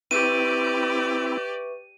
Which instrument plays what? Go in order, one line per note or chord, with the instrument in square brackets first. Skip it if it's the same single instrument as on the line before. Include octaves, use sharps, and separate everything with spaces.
[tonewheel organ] C4 E4 [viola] G4 D5 [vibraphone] B4 E5 C#6 [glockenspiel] D#7